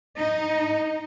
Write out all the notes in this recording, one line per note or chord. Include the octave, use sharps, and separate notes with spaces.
D#4 D#5